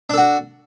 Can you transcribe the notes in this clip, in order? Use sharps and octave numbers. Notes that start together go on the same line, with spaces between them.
D4 F#4 A4